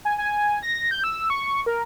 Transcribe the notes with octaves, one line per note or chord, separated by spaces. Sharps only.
G#5
G#5
A#6
G6
E6
C#6
A#4